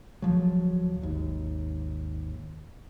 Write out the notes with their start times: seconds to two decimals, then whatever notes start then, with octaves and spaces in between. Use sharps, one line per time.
0.22 D1 F#2 F3 F#3
1.02 G#1 D#2